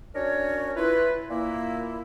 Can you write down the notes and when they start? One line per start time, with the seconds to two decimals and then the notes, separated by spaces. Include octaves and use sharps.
0.15 C#4 D4 F#4 A#4 C#5
0.77 E4 F4 B4
1.29 A#2 A#3 E4